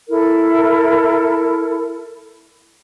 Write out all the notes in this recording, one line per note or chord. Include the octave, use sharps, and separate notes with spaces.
E4 A4 A#4